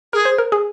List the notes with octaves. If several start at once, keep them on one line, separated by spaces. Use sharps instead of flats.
G#4 A#4
C5
A#4
G#4